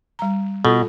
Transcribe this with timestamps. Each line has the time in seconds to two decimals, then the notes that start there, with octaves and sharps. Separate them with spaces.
0.19 G3 A#5
0.65 B2 F4 A4